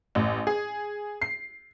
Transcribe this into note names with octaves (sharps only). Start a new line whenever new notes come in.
A1
G#4
C7